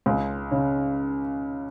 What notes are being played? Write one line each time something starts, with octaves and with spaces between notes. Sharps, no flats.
C#2
C#3